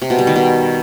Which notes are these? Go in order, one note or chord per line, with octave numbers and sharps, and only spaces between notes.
C3
B2
G3
D#3
B2